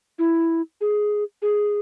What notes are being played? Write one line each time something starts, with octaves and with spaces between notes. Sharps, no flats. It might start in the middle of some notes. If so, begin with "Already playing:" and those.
E4
G#4
G#4